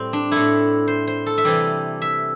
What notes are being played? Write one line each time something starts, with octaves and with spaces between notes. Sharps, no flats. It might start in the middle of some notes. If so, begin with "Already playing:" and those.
Already playing: A2 G3 C4
D4
A2 A3 E4
C5
C5
A4
E5
C3 E3 G3 D5
E5